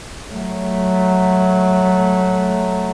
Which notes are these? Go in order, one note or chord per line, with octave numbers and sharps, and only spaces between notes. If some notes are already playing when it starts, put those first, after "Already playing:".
F#3 A3